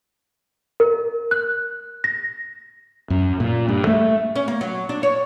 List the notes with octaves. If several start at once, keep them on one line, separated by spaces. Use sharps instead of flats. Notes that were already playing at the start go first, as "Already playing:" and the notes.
A#4
F#6
A#6
F#2
A#2
G2
A3
C#4
A#3
F#3
D4
C#5